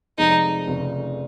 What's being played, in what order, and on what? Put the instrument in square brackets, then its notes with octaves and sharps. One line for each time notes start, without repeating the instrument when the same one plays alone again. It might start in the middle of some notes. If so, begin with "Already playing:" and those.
[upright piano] F1 F2 C3 F3 G#3 [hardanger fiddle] D#4
[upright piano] F1 F2 C#3